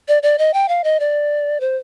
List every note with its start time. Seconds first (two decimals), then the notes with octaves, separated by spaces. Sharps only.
0.08 D5
0.23 D5
0.38 D#5
0.54 G5
0.69 F5
0.84 D#5
1.00 D5
1.60 C5